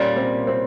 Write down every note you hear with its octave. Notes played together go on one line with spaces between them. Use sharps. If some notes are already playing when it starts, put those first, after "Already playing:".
Already playing: A#2 G3 A#3 C#4
C4
C4